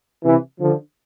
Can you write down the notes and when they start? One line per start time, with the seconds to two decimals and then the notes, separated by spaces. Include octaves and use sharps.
0.23 C3 E3
0.60 D3 F3